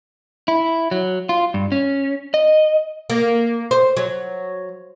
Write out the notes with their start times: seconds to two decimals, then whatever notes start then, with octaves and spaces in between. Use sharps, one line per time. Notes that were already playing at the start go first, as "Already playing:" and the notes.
0.48 E4
0.91 F#3
1.29 F4
1.54 G2
1.72 C#4
2.34 D#5
3.10 A#3
3.71 C5
3.97 F#3